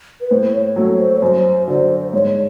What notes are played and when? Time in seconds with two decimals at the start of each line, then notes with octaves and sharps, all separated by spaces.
0.21 B4
0.31 A2 C5
0.53 C#5
0.76 F#3 A3 C#5
0.99 C5
1.17 C#5
1.22 F#2 C5
1.67 D3 F#3 C5
2.13 G#2 C#5